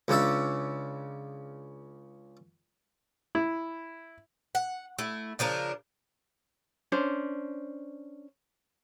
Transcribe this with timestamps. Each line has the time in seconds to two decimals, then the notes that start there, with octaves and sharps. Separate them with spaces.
0.08 C#2 C#3 D4 E5
3.35 E4
4.55 F#5
4.99 A3 E4
5.39 C#3 F3 D4 A#4
6.92 C#4 D4 C5